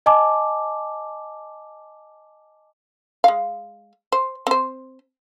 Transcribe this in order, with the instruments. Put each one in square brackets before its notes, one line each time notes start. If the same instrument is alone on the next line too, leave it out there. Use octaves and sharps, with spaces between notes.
[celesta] D#5 G#5 A5 D6
[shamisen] G#3 F5
C5
C4 C5